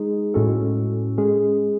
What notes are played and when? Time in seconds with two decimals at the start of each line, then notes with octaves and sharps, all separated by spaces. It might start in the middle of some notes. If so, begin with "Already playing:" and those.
Already playing: G#3 D#4 G#4
0.34 A2 G#3 C#4 F#4 A4
1.18 G#3 C#4 G#4